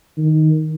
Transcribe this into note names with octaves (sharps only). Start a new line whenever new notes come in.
D#3